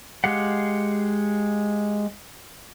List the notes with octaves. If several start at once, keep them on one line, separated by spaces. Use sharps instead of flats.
G#3 G4 F5 F#5